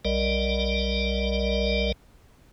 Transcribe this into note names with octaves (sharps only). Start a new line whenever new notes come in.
B1 G3 A#4 D5 D#5